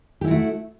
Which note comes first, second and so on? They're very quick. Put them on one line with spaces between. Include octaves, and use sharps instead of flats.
G4 E4 F#4 A3